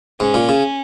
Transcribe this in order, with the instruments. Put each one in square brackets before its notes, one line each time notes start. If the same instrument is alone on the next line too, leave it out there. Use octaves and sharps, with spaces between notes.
[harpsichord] G#2 [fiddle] C#4
[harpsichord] A#2
C#3